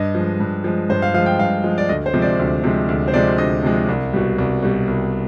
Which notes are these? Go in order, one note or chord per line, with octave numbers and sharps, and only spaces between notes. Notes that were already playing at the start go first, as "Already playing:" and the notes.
Already playing: G2 D#5
F3 G#3
G2
F3 G#3
G2 C5
F5
F3 G#3 F5
G5
G2 F5
F3 G#3
D5
D2 D#5
C5
C3 F3 G#3
D5
D2
C3 F3 G#3
D2
C5
C3 F3 G#3 D5
D2 D#5
C3 F3 G#3
C2
B2 G3
C2
B2 G3
C2